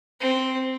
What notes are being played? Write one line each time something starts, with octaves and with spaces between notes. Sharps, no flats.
C4